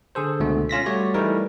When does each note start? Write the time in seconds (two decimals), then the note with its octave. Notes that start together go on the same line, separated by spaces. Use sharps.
0.15 D3 G#4 A4 C5
0.40 C#2 B2 D3 A3
0.69 C#4 F4 A#6 B6
0.86 G3 A3 F#4 C#5 D5
1.14 E3 G3 A3 D#4 A#4 B4